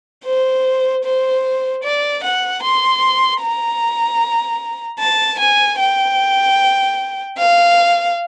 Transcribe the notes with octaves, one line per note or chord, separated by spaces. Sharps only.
C5
C5
D5
F#5
C6
A#5
A5
G#5
G5
F5